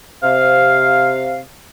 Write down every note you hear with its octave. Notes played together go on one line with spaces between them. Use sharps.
C3 F5